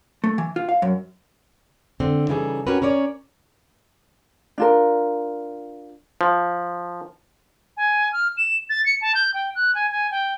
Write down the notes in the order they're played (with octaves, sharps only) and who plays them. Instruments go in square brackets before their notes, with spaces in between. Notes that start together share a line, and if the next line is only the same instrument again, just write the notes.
[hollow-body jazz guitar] A3
E3
F4
F5
F#2
[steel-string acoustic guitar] D3 C4
C#3 E3 G3 D#4 G#4 A4
C#4 F#4 G4 A#4 B4
C#4 A#4 C#5 D5
[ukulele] D4 F4 A#4
[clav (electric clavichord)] F3
[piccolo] G#5
F6
E7
A6
C#7
A5
G6
G5
F#6
G#5
G#5
G5